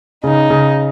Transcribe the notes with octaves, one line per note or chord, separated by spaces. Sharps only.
C#3 D#4
C#3